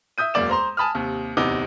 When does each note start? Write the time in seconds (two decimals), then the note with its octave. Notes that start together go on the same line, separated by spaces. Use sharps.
0.18 E5 D#6 G6 D#7
0.34 E1 F#2 A#3 D5 E7
0.49 C5 A#5 C6
0.77 G#5 A5 B5 D#6 F6
0.95 D#2 C3
1.37 D1 E2 C3 D#4 D6